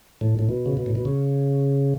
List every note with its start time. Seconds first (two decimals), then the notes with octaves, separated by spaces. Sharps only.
0.21 A2
0.39 A2
0.49 B2
0.66 C#3
0.77 B2
0.86 A2
0.95 B2
1.05 C#3